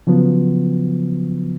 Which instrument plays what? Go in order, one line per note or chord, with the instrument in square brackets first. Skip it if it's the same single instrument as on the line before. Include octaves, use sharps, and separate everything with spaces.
[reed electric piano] C#3 F3 F#3 B3